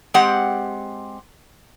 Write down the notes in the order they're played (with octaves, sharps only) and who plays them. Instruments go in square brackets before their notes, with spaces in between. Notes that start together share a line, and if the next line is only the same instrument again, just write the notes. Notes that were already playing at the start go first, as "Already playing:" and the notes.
[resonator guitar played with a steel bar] G#3 C4 G4 D#5 F#5